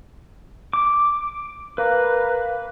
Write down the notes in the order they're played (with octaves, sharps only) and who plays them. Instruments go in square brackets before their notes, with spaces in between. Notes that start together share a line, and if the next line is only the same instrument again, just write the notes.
[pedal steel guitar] D6
[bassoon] A#3 [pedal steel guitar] B4